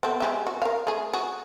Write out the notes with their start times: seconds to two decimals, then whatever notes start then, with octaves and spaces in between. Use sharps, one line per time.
0.03 B3 C4 A4
0.20 G#3 G4 E5
0.47 F#4
0.62 A#4 F5
0.87 A3 G#4
1.13 F#4 G#4